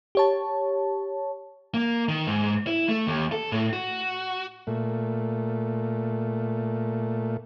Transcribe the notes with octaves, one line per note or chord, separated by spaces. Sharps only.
G4 C#5 A5
A#3
D#3
G#2
E4
A3
D#2
A4
A2
F#4
A#2 A3